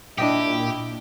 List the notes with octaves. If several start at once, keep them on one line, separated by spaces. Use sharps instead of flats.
A#2 D4 E4 G4 D#5 G5